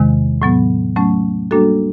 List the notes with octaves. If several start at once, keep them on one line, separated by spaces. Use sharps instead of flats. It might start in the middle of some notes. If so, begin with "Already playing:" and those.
Already playing: E2 C3 D#3 G#3
A2 F#3 B3
F#3 A3 C#4
G3 A#3 D4 F#4 A4